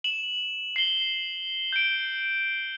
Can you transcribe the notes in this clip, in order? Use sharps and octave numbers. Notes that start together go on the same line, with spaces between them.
E7 F#7
C7 G7
G6 D7